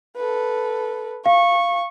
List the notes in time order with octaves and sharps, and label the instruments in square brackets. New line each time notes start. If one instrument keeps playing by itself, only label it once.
[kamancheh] A4 B4
[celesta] F5 [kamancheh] C#6